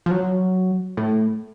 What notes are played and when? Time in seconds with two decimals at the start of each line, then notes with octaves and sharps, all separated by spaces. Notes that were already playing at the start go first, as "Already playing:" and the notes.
0.06 F3
0.11 F#3
0.97 A2